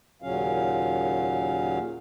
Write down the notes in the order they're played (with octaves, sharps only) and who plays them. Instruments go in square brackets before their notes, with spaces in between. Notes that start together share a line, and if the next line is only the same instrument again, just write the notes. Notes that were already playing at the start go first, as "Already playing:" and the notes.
[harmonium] D#2 A#2 C#3 F#3 C#4 F5